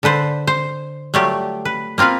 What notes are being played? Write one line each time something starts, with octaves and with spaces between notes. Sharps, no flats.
D3 A4 B4 C5
C5
F#3 G3 A3 F4 G4
B4
A#3 C4 F4 A#4 B4